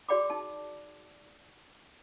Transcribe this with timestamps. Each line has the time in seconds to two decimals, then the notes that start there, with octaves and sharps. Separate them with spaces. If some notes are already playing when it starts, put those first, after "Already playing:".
0.09 F#4 G#4 D5 G5 B5 D6
0.30 D#4 A5